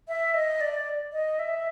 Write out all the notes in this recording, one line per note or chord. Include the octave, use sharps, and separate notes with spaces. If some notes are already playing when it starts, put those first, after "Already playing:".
E5
D#5
D5
D#5
E5